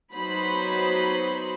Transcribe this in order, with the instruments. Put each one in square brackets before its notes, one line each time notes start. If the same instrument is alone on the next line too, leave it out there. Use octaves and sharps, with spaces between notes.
[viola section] F#3 B3 D#4 C5 B5